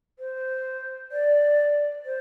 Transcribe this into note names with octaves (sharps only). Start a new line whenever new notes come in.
C5
D5
C5